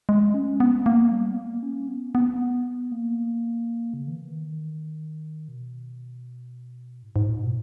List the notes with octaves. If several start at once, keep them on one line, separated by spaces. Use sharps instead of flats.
G#3
C#4
B3
A#3
G3
B3
A#3
C#4
B3
B3
A#3
C#3
D#3
E3
D#3
B2
G#2
G#2
A#2
B2